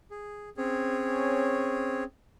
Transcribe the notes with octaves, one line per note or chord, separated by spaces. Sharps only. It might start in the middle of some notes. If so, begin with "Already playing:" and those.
G#4
C4 C#4 G#4 C#5